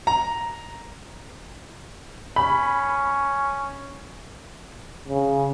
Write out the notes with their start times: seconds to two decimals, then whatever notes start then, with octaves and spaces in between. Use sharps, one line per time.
0.07 A#5
2.36 C#4 B5
5.08 C#3